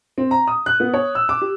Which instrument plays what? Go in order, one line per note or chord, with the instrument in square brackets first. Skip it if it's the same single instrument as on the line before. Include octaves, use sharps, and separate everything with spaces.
[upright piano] C4
A#5
D#6
F#6
B3
C#5
E6
D6
G4